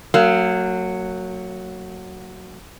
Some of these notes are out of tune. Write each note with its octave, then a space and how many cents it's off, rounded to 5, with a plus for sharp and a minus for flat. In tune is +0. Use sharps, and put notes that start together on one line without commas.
F#3 +0 A#3 -35